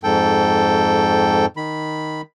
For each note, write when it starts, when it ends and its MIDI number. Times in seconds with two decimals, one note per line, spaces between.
0.04 1.46 41
0.04 1.46 44
0.04 1.46 69
0.04 1.46 79
1.57 2.21 51
1.57 2.21 83